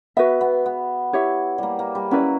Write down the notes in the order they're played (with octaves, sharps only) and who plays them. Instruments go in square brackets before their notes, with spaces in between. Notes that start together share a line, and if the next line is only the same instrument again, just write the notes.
[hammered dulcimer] B3 [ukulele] F#4 B4 E5
[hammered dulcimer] B3
B3
[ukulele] E4 G4 C#5 E5
[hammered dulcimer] G3 A#3
A#3
G3
[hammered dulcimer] F#3 [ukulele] C#4 E4 B4 D5